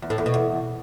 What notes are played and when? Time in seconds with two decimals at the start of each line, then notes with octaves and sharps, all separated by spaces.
0.02 E2
0.10 A2
0.18 E2
0.26 B2
0.34 E2